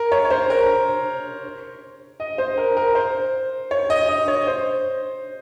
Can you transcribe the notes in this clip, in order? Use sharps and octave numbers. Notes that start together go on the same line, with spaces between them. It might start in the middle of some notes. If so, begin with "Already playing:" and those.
Already playing: A#4
C#5
C#5
C5
A#4
D#5
C5
A#4
A#4
C5
C#5
D#5
D#5
C#5
C5